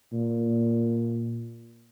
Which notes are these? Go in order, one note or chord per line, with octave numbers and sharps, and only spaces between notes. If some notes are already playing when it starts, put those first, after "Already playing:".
A#2